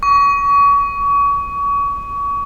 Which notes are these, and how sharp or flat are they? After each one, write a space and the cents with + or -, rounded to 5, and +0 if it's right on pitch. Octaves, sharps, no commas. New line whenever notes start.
C#6 +35